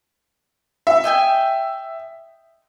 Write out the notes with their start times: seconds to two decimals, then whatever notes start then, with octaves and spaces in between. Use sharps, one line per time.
0.87 E5
1.04 D#5 G5 G#5